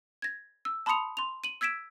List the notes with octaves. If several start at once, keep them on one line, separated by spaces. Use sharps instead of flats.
G#6 A#6
E6
A5 B5 C6 D#6 C#7 F7
C6 F7
D#7 F#7
E6 G#6 B6 D7 E7